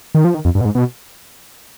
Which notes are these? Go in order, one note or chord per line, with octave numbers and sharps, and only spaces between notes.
D#3
F3
D#3
F2
G2
B2
G#2
B2